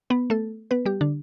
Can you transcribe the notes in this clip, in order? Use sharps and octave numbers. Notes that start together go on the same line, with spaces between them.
B3 B4
A3 A4
B3 B4
G3 G4
D3 D4